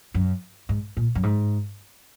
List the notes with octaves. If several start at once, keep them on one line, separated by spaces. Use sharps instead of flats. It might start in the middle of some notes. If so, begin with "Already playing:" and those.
F#2
G#2
A#2
F#2
G#2